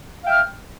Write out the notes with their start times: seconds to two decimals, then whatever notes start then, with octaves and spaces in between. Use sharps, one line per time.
0.22 F5
0.24 G5
0.27 E5
0.30 F6